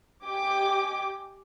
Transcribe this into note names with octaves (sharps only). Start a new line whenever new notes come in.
G4 D#5 G5 G#5 D6